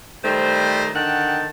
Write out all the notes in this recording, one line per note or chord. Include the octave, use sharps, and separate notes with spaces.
D#3 G3 A3 C5
D3 D#3 F#5 G5 A5